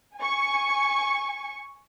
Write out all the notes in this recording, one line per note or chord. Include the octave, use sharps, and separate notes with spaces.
G#5 C#6